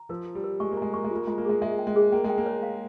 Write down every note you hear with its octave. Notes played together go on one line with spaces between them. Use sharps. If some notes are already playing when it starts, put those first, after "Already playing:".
Already playing: A#5
F3 A#4
A#4
G3
A#4
G#3 C#6
A#3
G#3 A#5
A#3 C#6
G#3
A#3 F4
G#3 F4
A#3
G#3 G#4
G#3 E5
G5
G#3
G#4
A#3 G5
G#3
G5
A#3
C#5
F5